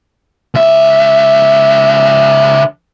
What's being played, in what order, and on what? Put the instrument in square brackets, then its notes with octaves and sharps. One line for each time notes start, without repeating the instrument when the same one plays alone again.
[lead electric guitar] C#2 E5